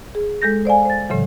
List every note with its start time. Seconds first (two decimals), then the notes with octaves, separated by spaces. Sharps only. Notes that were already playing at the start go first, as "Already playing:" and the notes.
0.15 G#4
0.42 G#3 A4 G6 A#6
0.65 C5 D5 F5 G#5
0.85 C5 A6
1.09 A2 C#3 E3 F#3